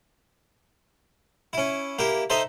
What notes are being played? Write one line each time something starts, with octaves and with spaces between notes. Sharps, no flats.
C#4 E4
A#3 E4 G4
D#4 A4 C5 E5